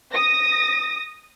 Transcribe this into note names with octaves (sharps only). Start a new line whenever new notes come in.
D#6 A#6